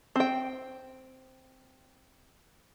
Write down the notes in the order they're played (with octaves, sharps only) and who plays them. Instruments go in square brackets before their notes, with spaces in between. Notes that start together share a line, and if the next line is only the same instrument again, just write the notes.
[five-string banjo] C4 G5